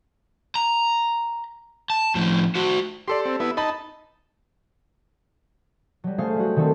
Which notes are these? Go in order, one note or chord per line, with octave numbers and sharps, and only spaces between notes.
A#5
A5
A2 F3
F#4 C5
G4 A4 D5 C6
C4
B3 E4
D#4 D#5 A5 B5
F#3 G3
A3 C#4 G#4 C5 F5
G3 F#4
D3 D#3 A3 A#3 C4